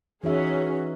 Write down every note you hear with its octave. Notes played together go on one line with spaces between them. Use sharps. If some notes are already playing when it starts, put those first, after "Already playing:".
E3 C#4 D#4 F#4 G#4 E5